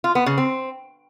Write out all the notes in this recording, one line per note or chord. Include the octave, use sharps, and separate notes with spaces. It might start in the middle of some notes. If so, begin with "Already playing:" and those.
F4
B3
C#3
C4